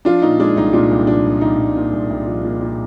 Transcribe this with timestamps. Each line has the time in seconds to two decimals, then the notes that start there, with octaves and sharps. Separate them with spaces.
0.05 F3 D4 F4
0.22 A#2 D#4
0.40 G#3 D4
0.56 C2 D#4
0.73 A#2 D4 F4
0.91 C2
1.07 F3 D4
1.25 C2
1.41 C2 D#4
1.59 C2
1.76 A#2
1.93 C2
2.10 C2
2.27 F3
2.44 A#2
2.61 A#2